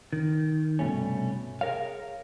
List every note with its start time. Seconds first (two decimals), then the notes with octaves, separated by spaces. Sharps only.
0.13 D#3
0.79 C2 G2 B2 A3 C#4
1.61 G#4 A#4 C#5 F5